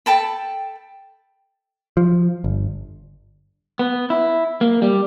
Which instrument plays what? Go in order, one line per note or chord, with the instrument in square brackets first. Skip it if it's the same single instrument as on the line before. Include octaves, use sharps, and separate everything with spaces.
[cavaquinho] A4 G5 A5 B5
[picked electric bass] F3
G1
[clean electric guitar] B3
E4
A#3
G3